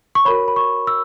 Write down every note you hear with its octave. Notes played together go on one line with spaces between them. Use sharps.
C#6
F#4 A#4 C#5 B5
B5
C#6
E6